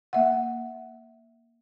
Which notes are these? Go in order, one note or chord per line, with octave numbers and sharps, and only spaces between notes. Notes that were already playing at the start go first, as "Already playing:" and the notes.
A#3 E5 F#5